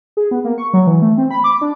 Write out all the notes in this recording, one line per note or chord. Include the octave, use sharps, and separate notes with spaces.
G#4
B3
A#3
C#6
F#3
E3
A3
C4
B5
D6
D4